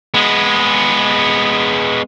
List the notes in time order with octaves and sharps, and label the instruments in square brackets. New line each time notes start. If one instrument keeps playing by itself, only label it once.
[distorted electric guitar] G#3 B3